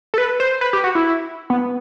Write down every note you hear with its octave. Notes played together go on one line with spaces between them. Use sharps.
A4
B4
C5
B4
G4
F#4
E4
B3